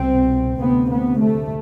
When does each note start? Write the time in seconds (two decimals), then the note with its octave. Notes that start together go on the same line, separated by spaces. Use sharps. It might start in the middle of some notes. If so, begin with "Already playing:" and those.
Already playing: C2 B2 C4
0.62 D2 C3 B3
0.92 B3
1.21 A3